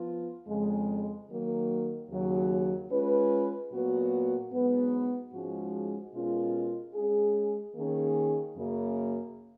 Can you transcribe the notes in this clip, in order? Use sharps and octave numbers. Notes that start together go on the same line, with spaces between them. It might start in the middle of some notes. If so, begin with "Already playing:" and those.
Already playing: F3 B3 F4
F2 C#3 G#3
D#3 F#3 A#3
D#2 C#3 F#3
G#3 C#4 F4 B4
A#2 F#3 B3 F#4
G#2 F#3 B3
G#2 F3 G#3 C#4 F#4
B2 G#3 C#4 F4 A#4
G#3 C#4 G#4
D#3 A#3 C#4 G#4
F#2 C#3 F#3 A#3